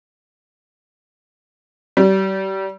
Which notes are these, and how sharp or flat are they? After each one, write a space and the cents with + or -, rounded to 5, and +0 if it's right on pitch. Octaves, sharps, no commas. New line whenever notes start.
G3 -30